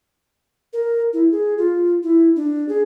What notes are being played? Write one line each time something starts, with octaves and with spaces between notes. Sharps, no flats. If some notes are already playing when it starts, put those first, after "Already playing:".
A#4
E4
G#4
F4
E4
D4
G#4